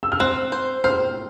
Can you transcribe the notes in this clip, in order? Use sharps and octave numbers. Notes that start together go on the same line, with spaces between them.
E6
F6
C4 F#6
C5
C5 F6